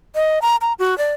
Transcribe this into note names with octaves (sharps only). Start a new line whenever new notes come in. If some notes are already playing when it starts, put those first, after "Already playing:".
D#5
A#5
A#5
F#4
D5